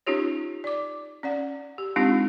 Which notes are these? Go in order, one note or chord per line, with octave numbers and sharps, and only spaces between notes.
C#4 D#4 F4 G4 C#5
D5 D6
C#4 D5 F#5
G4
G#3 C4 D4 D#4 F4 G4